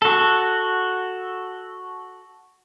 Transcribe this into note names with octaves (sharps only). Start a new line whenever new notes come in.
F#4 A4